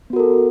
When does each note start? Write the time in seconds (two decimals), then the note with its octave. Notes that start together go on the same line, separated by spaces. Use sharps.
0.10 B3
0.13 F#4
0.16 A#4
0.19 A4